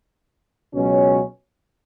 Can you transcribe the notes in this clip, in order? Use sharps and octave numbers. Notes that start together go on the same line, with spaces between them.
C#2 B2 F#3 C#4